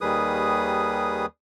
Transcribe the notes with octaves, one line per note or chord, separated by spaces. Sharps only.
D#2 D#3 G3 G#4 B4 D#6